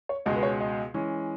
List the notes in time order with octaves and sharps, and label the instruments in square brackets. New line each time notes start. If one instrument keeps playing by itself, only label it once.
[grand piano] C#5
[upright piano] C#2 B2 G#3 [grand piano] D#5
[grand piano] B4
C#5
D#5
[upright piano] E3 G#3 C#4